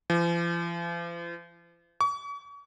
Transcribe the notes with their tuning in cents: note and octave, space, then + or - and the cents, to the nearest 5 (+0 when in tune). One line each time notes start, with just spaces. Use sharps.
F3 -45
C#6 +40